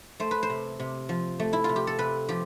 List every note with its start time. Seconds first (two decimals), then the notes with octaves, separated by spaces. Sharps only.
0.20 A3 C5
0.31 B4
0.43 C5
0.50 C3
0.80 C3
1.09 F3
1.40 A3
1.53 E4
1.64 C3 F4
1.76 G4
1.87 A4
1.99 C3 B4
2.29 F3 G4